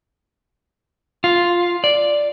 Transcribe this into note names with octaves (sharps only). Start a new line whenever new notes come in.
F4
D5